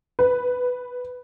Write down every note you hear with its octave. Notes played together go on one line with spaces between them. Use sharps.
B4